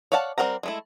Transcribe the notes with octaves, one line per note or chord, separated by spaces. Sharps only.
C#5 D5 F5 F#5 A5
G3 C4 A#4 F#5 A#5
G#3 A3 E4